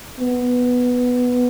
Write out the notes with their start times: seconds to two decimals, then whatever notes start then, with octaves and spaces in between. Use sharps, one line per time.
0.20 B3